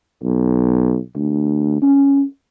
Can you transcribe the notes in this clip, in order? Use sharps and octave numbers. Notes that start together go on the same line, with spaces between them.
B1
D2
C#4